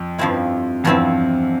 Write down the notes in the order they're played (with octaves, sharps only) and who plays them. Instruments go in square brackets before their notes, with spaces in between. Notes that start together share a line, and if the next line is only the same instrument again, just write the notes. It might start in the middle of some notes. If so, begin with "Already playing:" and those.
Already playing: [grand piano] F2
[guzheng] G2 F3 C4 E4
[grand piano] E2 [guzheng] G2 F3 C4 E4